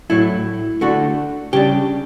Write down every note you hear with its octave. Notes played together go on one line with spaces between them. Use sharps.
A2 F#3 A3 E4
D3 A3 D4 F#4
C#3 G3 D4 G4